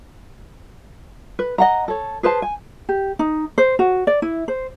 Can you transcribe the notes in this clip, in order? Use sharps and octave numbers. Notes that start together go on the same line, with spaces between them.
B4
D#5 F#5 A#5
A4 C#5
G#4 B4 C5 A5
G#5
G4
D#4
C5
F#4
D5
E4
C5